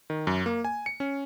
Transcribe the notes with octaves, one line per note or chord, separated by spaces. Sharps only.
D#3
F#2
A#3
G#5
C#7
C#4